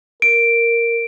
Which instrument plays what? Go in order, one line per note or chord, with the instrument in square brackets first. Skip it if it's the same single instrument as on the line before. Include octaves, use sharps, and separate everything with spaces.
[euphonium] A#4 [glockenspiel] D7